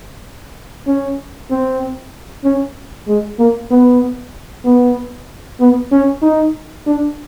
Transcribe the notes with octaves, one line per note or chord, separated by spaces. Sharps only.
C#4
C4
C#4
G#3
A#3
B3
B3
B3
C#4
D#4
D4